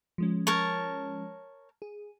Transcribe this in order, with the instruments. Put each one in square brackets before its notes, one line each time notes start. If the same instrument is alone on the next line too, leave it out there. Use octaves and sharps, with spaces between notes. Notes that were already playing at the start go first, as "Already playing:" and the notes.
[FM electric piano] F3 G#3 C#4
[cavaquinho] A#4 C#5 A5
[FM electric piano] G#4